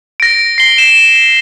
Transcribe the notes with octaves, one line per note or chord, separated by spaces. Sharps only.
A#6 D7
C7 G7
E7